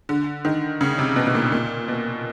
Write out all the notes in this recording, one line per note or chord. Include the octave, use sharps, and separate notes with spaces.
D3
D#3
C#3
C3
B2
B2
A#2
A#2
B2